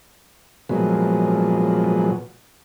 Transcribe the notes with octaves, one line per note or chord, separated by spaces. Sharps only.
A#2 F3 F#3 G#3 B3